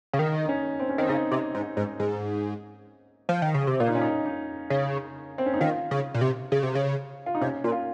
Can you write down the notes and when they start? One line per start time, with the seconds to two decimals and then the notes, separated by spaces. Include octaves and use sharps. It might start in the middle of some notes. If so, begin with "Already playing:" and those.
0.13 C#3
0.19 D#3 D#4
0.45 D#4
0.49 C#4
0.80 C4
0.89 C#4
0.98 D#3 C4
1.09 C#3 D#4
1.31 C3
1.55 G#2
1.77 G#2
2.00 G#2
3.29 F3
3.42 D#3
3.54 C#3
3.67 C3
3.80 A#2 F4
3.88 D#4
3.95 C#4
4.02 D#4
4.26 D#4
4.70 C#3
5.38 C4
5.46 C#4
5.54 D#4
5.60 D#3 F4
5.91 C#3
6.14 A#2
6.21 C3
6.52 C#3
6.63 C3
6.75 C#3
7.26 F4
7.35 D#4
7.41 C3 C#4
7.64 A#2
7.72 F4